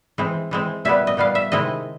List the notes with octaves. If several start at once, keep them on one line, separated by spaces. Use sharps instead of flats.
E3 G#3 C4
E3 G#3 C4
A#2 G3 B3 E5
D#5
A#2 G3 B3 F5
E5
C3 D#3 G#3 C4 E4 D#5